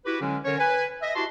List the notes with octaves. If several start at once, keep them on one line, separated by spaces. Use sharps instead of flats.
E4 F#4 G4 B4
D3 F#3 G#3 C#4
D3 C#4 A#4 C#5
B4 G#5
D#5 E5
E4 F#4 G4 A5 C6